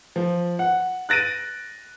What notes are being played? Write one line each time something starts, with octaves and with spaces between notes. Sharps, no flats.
F3
F#5
F#6 A6 A#6 D7 D#7